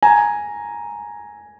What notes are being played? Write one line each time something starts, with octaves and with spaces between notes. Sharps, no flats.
G#5 A#5